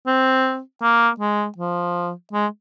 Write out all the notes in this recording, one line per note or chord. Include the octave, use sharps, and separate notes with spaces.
C4
A#3
G#3
F3
G#3